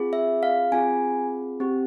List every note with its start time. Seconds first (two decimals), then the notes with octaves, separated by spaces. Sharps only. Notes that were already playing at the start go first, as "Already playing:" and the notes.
Already playing: C4 F4 G#4
0.13 E5
0.43 F5
0.72 C4 F4 G#4 G#5
1.60 C4 G4